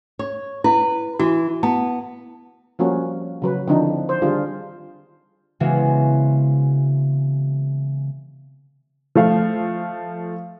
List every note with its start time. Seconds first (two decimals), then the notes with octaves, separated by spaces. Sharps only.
0.19 C#5
0.64 E4 B4
1.19 E3 F#4
1.63 B3 A5
2.79 F3 G3 A#3 C#4 F#4
3.42 C#3 F#3 B4
3.68 D3 E3 F3 C4 D4 D#4
4.09 C5
4.22 D3 D#3 G3 D4 F4 G#4
5.60 C#3 E3 G#3 B3 C4 F#4
9.15 F3 A3 F5